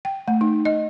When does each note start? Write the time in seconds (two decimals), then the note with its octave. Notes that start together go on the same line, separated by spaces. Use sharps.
0.05 G5
0.28 A3
0.41 D#4
0.65 D#5